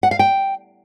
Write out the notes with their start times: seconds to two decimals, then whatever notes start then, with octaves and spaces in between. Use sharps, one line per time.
0.03 F#5
0.11 F5
0.19 G5